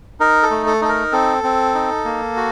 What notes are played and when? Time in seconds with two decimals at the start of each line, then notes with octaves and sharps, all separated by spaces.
0.20 D#4 A#4
0.43 A4
0.51 A3
0.66 A4
0.82 D#4 A4
0.89 A#4
1.12 C4 A4
1.44 C4
1.74 D#4
2.05 A#3
2.36 F#4